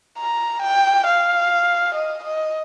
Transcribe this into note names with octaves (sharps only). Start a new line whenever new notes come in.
A#5
G5
F5
D#5
D#5